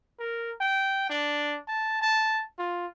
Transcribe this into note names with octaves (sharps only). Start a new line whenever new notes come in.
A#4
G5
D4
A5
A5
F4